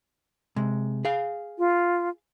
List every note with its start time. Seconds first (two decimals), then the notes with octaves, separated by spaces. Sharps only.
0.56 C3 G#3
1.05 G#4 F5
1.58 F4